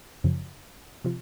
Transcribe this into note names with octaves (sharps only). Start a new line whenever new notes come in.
F#2 C#3 F3
C3 F3